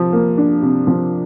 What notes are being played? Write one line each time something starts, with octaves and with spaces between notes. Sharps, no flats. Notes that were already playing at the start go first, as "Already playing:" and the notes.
Already playing: C3 F3
A#3
D4
C3
F3